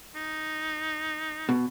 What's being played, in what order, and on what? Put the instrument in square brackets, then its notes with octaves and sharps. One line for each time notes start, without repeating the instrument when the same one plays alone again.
[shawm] D#4
[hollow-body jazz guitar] B2